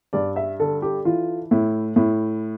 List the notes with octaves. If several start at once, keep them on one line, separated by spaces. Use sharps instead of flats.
G2 D5
E5
D3 A4
G4
E3 F4
A2 E4
A2 E4